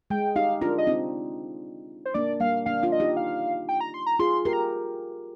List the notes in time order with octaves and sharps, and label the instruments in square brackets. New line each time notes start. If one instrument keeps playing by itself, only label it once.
[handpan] G#3 [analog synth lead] G5
[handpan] D#4 G4 [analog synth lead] F5
[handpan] D4 F4 [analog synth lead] A#4
[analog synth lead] D#5
[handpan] C4 D#4
[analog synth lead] C5
[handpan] A#3 D4 [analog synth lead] D5
[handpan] G3 A#3 [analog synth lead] F5
[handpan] A#3 D4 [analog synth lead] F5
[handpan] D4 F4
[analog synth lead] D#5
[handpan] D#4 G4
[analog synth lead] F5
G5
A#5
C6
A#5
[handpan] F4 G#4 [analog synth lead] C6
[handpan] G4 A#4 [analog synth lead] C6
[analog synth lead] A#5